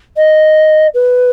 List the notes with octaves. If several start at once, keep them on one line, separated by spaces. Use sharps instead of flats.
D#5
B4